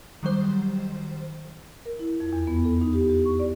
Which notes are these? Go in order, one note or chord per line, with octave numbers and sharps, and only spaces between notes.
D#3 F#3 G3 C5
A#4
E4
F2
E2
B3
A4
D#4
G4
G4
C#6
D5